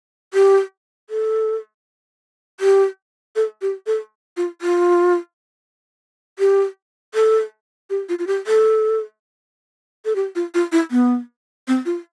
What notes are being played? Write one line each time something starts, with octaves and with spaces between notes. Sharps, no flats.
G4
A4
G4
A4
G4
A4
F4
F4
G4
A4
G4
F4
F4
G4
A4
A4
G4
F4
F4
E4
B3
C4
F4